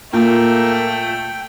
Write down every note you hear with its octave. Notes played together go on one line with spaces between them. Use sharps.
A#2 A3 A#3 G5